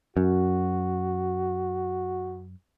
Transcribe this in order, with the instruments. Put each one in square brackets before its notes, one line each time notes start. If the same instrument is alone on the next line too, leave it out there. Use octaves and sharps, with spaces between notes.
[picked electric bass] F#2 [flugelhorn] F#4